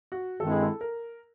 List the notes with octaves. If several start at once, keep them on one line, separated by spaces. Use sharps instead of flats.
F#4
G2 D#3 G#3 C4 E4 A4
G#4
A4
A#4